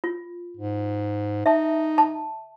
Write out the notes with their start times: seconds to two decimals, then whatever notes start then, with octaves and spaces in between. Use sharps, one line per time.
0.04 F4
0.57 G#2
1.46 D#4 E5 A5
1.98 A5